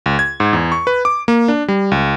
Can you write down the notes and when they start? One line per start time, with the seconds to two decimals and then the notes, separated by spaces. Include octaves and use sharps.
0.06 C#2
0.19 G#6
0.40 G#2
0.53 E2
0.72 C#6
0.87 B4
1.05 D6
1.28 A#3
1.48 D4
1.68 G3
1.92 C#2